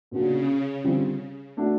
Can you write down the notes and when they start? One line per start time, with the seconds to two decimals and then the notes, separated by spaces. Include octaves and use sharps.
0.11 A#2 C#3 F#3 B3 D4 F#4
0.84 D3 G3 C4 F4
1.57 A3 D4 F#4